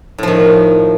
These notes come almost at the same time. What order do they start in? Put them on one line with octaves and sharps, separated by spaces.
A2 F3 D#3